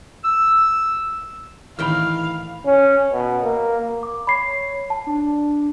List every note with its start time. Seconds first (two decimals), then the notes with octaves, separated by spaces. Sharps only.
0.24 E6
1.79 A2 D#3 E3 F5 G5 B5 F6
2.66 C#4
3.13 B2
3.44 A#3
4.03 D6
4.27 C#5 B5 C7
4.90 A5
5.07 D4